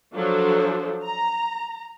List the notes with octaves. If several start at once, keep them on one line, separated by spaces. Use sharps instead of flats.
F3 F#3 D4 A4 C5
A#5